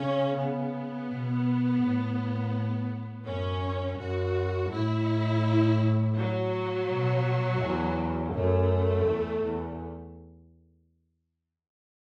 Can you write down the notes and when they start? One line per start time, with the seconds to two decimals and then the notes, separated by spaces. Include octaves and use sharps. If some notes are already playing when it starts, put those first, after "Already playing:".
Already playing: C#3 C#4
0.35 B3
1.07 B2
1.81 A2
3.26 F#2 C#4
3.98 F#2 F#4
4.70 A2 E4
6.16 F#3
6.89 B2
7.61 E2
8.34 F#2 A3
9.06 E2
9.43 E2